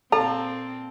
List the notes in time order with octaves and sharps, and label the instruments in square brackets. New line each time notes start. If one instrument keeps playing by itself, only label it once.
[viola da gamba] A#2 C4 [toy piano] A4 [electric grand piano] F5 A5 [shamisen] A#5